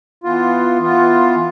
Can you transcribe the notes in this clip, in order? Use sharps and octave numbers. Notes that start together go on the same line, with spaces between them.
E3 B3 F4
E3 B3 F4